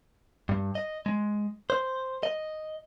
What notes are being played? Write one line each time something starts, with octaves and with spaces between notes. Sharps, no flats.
G2
D#5
G#3
C5
D#5